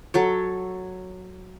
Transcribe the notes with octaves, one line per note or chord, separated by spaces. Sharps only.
F#3 A4 C#5